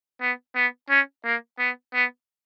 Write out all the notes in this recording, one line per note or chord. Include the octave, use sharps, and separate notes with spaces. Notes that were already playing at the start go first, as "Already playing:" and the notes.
B3
B3
C#4
A#3
B3
B3